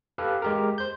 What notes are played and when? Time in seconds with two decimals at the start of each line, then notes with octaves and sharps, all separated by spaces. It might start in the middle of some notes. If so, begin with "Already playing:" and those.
0.18 G4 A4 B4 F5
0.42 G#3 G4 A#4
0.78 C5 G6